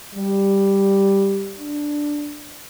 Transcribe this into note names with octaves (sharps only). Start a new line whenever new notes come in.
G3
D4